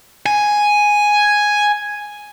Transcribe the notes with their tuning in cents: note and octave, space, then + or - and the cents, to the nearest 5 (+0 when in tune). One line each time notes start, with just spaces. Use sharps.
G#5 +0